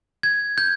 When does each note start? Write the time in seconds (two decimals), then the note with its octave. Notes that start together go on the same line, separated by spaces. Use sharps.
0.23 G#6
0.58 G6